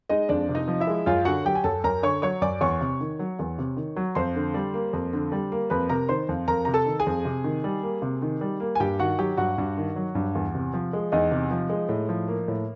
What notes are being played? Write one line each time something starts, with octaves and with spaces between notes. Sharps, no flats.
G#3 D#4 D#5
F2 D4 D5
C3
D#4 D#5
F3
E4 E5
G#3
F#2 F4 F5
D3 F#4 F#5
F#3 G4 G5
G#5
F#2 A4 A5
F#2 A#4 A#5
D3 C#5 C#6
F#3 C#5 C#6
F#2 D5 D6
E2 C#5 C#6
C3
D#3
F#3
E2
C3
D#3
F#3
F2 C5 C6
D3
G3
A#3
F2
D3
G3
A#3
F2 B4 B5
C3 A#4 A#5
D#3 C5 C6
F2
F2 A#4 A#5
C3 A#5
A4 A5
D#3
G#4 G#5
F2
C3
D#3
G3
A#3
C3
D#3
G3
A#3
G#5
G2 G4 G5
D#3 F#4 F#5
F#3 G4 G5
G2 F#4 F#5
G2
D#3
F#3
G2
E2
C3
F3
G#3
E2 D#4 D#5
C3
F3
G#3
A2
F3
A#3
A2